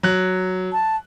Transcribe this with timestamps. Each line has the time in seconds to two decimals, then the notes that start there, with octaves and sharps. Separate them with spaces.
0.03 F#3 F#6
0.73 A5